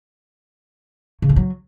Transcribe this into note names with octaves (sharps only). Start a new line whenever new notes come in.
C#3
A2
F#3